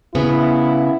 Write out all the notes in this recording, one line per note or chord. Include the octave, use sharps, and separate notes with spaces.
C#3 B3 E4